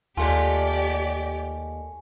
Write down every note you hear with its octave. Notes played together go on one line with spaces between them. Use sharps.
D#2 G#3 A3 F4 G4 D5 G#5